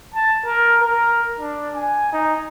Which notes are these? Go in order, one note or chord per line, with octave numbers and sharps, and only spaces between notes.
A5
A#4
A#4
D4
G#5
D#4